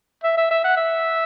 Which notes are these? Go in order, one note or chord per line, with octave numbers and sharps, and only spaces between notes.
E5
E5
E5
F#5
E5